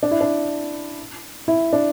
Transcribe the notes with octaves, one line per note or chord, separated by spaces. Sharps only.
D4
E4
D4
E4
D4